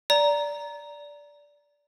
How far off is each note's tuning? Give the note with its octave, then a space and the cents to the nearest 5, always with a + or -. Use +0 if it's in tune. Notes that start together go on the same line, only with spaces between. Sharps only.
D5 -10 A#5 +0